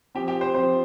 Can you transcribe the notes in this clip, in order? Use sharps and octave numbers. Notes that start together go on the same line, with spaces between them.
F3 C4 G4
G4
C5
F3 C4 C5